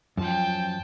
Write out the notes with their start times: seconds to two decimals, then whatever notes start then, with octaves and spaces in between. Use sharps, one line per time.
0.17 F#2 F3 G5 A5